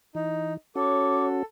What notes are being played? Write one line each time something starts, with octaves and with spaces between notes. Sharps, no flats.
E3 D#4
C#4 F#4 A4 C#5 D6